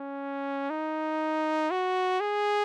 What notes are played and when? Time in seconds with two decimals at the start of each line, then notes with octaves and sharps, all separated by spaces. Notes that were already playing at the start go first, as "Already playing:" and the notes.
Already playing: C#4
0.70 D#4
1.71 F#4
2.20 G#4